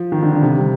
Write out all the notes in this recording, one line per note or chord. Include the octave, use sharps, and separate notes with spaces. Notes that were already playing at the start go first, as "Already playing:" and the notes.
Already playing: F3
D#3
D3
D3
C3
G3